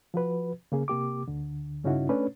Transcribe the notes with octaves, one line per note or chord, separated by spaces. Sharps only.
F3 F#4 B4
C#3 A#3 G#4
C3 A#3 G4 D6
D2 D3
G2 C#3 C#4 D#4 E4 F#4
A3 C#4 D4 B4 C#5